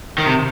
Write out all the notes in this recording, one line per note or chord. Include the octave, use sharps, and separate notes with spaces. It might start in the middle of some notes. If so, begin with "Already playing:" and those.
D#3
C3